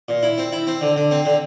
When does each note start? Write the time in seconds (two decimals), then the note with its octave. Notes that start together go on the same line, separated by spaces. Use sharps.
0.09 A#2
0.23 E4
0.38 C4
0.52 E4
0.67 C4
0.81 D3
0.96 D3
1.11 C4
1.25 D3